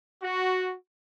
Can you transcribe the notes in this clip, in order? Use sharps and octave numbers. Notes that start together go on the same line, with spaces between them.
F#4